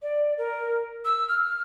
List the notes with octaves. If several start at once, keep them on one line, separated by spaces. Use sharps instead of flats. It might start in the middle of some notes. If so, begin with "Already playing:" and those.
D5
A#4
E6
F6